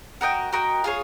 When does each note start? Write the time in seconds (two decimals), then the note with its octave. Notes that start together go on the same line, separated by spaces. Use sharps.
0.21 F#4 A#4 D#5 G5
0.52 F#4 A#4 D#5 G5
0.84 F4 G#4 C#5